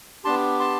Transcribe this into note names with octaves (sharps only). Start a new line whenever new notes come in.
B3 D4 G4 A5 C6
A5 C6